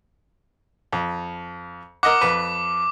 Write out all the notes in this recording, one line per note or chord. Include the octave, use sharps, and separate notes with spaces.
F2
A#4 D#5 F#5 D6
F2 B4